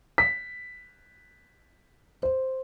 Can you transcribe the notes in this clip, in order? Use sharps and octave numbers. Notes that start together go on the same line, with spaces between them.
B6
C5